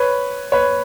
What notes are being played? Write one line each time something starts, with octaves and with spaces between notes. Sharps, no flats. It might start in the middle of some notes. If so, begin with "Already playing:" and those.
Already playing: B4 C#5
B4 C#5